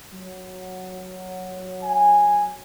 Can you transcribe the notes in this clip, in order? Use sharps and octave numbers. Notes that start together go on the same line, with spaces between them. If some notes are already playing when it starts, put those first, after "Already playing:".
F#3
G#5